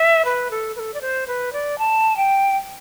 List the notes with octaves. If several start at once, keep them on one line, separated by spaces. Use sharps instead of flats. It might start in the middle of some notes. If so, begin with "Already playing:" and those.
Already playing: E5
B4
A4
B4
A4
D5
C5
B4
D5
A5
G5